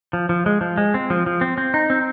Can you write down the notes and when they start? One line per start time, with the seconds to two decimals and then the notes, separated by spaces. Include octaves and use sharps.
0.13 F3
0.29 F3
0.46 G#3
0.61 F3
0.78 G#3
0.94 C4
1.10 F3
1.26 F3
1.41 C4
1.58 C4
1.74 D#4
1.90 C4